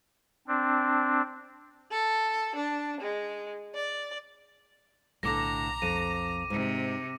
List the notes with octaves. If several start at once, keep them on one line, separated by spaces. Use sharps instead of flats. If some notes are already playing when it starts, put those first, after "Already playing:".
C4 D4
A4
D4
G#3
D5
B1 A2 D3 A#5 D6 A#6
F2 D#7
G#2 C3